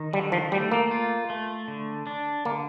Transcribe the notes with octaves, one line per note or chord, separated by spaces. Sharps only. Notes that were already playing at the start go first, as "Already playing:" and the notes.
Already playing: D#3
D3 G3
F3
G3 A3
A#3
F4
A3
D3
D4
D3 A#3